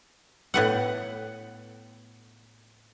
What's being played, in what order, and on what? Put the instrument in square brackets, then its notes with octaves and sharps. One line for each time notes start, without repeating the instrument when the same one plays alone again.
[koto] A2 B3 F#5